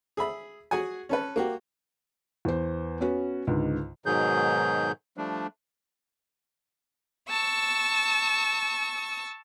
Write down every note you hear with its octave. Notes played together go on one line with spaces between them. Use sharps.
G#4 E5 B5
F#4 G#4 F#5 G#5
C#4 A4 B4
A#3 F#4 G4
E2 C5
B3 C#4 F#4 B4
C#2 G#2 D3
G#2 B2 D#3 F#3 G#4 G6
F3 G3 A3 D4
A5 C#6 E6